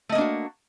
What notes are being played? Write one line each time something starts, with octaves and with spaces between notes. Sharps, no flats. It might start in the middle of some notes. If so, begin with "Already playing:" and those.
A3 A#3 D4 F#4 D#5